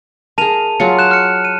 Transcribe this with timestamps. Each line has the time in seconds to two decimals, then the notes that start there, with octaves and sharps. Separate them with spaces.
0.38 G#4 A#4 A5 D#7 F7
0.80 F#3 F4 G#4 C#7
0.99 F#6 E7
1.11 F6 C#7
1.45 D#7